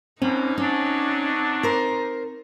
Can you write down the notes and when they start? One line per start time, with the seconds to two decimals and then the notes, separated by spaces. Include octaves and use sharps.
0.22 B2 D3 A#3 C4 C#4 D#4
0.58 F#3 C#4 D4
1.63 A#4 C5